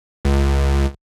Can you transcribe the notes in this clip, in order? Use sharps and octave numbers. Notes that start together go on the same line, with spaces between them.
C#2